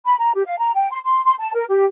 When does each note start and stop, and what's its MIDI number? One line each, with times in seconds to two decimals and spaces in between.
0.05 0.15 83
0.19 0.33 82
0.35 0.46 67
0.46 0.58 77
0.58 0.71 82
0.75 0.87 79
0.91 1.00 84
1.04 1.23 84
1.24 1.33 84
1.39 1.52 81
1.55 1.64 70
1.70 1.85 67